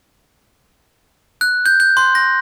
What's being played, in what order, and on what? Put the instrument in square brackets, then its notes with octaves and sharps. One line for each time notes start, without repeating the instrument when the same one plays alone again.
[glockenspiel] F#6
G6
G6
C6
A#6